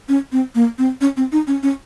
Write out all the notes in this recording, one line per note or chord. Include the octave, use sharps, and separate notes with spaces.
C#4
C4
A#3
C4
C#4
C4
D#4
C#4
C#4